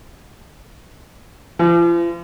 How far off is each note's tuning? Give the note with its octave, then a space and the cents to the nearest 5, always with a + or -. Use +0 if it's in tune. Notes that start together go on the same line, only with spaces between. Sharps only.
F3 -45